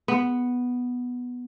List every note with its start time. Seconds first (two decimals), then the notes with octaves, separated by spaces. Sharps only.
0.08 B3